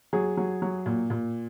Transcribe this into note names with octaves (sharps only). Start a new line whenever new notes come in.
F#3 G#4
F#3
F#3
A#2
A#2